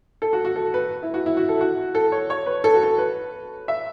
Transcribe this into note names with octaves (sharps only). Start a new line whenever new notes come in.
A4
F#4
F#4
A4
B4
E4
F#4
E4
F#4
A4
F#4
A4
C#5
C#5
B4
A4
F#4
A4
B4
E5